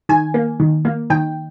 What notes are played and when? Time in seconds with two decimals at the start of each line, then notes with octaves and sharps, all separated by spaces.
0.09 D#3 G#5
0.34 A#3
0.60 D#3
0.85 A#3
1.10 D#3 G5